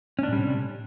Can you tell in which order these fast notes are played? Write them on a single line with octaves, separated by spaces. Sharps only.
C#4 D4 A2 G3 C3